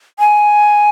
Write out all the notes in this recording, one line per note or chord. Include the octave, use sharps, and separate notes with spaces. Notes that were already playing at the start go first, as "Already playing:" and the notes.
G#5